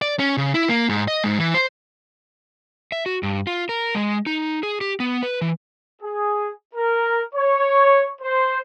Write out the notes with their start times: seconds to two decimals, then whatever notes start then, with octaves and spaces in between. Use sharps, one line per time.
0.02 D5
0.19 C#4
0.37 C#3
0.54 E4
0.69 A#3
0.89 G#2
1.08 D#5
1.24 G#2
1.39 E3
1.54 C5
2.92 E5
3.06 F#4
3.23 G2
3.47 F4
3.69 A#4
3.95 G#3
4.26 D#4
4.63 G#4
4.81 G4
5.00 B3
5.23 B4
5.41 E3
6.01 G#4
6.75 A#4
7.35 C#5
8.22 C5